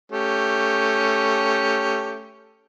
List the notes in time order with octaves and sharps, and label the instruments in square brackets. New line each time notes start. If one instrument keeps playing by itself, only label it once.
[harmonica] A3 C#4 G4